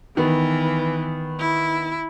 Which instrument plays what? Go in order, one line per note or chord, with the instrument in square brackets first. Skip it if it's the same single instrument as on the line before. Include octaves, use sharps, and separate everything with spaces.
[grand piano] D#3 B3 [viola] E3
[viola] E4